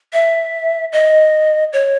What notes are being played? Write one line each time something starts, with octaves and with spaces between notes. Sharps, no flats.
E5
D#5
C#5